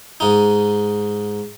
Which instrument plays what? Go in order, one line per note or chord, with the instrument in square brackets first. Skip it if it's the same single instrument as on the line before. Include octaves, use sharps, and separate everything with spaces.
[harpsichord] G#2 D#4